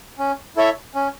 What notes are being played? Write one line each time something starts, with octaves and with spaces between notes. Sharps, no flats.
C#4
E4 A4 C#5 E5
C#4